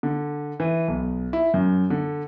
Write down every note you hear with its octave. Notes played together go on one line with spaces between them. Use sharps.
D3
E3
B1
E4
F#2
D3